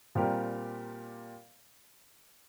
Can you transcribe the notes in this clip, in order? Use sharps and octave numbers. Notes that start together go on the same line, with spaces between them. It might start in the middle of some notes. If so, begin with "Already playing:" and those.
A#2 G3 C4 G4 A#4